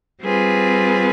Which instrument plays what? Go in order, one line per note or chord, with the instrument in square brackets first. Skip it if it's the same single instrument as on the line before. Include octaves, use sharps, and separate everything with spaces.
[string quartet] G3 C4 F4 G#4 B4